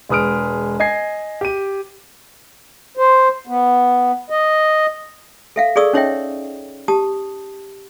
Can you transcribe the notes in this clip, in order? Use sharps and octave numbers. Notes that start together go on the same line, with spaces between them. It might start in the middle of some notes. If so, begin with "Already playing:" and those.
E1 G#3 B4 D#6 F6 D7
D#5 G#5 G#6 C7
G4 D#7
C5
B3
D#5
A4 E5 F5
G#4 A4 D5 C#6 D#6 E6
C#4 D#4 C#5 D#5 E5 G5
G4 A5 D#6